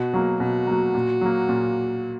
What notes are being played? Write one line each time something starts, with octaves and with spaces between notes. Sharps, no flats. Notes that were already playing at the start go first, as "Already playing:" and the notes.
Already playing: B2 F#4
F#3 A#3
B2 F#4
F#3 A#3
A#2
F#3 A#3
A#2